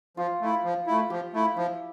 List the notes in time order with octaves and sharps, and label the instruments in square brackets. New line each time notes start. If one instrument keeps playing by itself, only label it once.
[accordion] F3 [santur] F4
[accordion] A3 E4
F3
A3 E4
[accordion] F3 [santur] G4
[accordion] A3 E4
[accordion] F3 [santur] E4